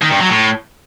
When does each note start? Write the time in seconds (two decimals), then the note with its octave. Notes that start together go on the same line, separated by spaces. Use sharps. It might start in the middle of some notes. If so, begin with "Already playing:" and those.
0.02 D#3
0.11 G2
0.20 F#3
0.29 A2